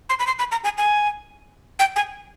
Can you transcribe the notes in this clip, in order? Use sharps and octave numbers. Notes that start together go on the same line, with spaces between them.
C6
B5
C6
B5
A#5
G#5
G#5
G5
G#5